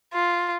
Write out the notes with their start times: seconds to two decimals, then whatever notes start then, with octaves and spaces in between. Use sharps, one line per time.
0.13 F4